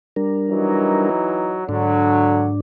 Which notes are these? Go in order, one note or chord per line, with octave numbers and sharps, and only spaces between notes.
G3 D4 A#4
E3 F#3 D#4
G#2 D3 F#3 D4